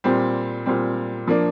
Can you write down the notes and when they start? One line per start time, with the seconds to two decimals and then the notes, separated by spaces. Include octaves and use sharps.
0.04 A#2 G3 C4
0.66 A#2 G3 C4
1.27 F3 A#3 D4